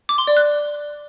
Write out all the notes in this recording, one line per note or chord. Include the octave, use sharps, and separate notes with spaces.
D6
C6
D5
F#6